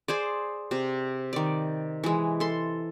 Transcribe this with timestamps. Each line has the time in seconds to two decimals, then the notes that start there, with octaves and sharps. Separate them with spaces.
0.08 G#4 C5 D5
0.71 C3
1.33 D#3 D5
2.04 E3 G#3
2.40 A4 C6